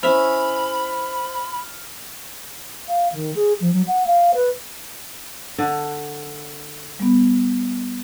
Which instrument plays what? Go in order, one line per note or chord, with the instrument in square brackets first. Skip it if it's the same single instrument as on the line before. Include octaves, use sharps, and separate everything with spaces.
[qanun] C#4 E4 E5 [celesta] C5 [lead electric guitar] B5 [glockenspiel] F6 F7
[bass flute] F5
D#3
G#4
F3
F#3
F#5
F5
B4
[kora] D3
[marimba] G3 B3